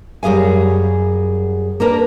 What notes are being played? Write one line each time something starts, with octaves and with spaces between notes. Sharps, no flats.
F#2 G3 G#4 F5 G#5
A#3 D4 A#4 B4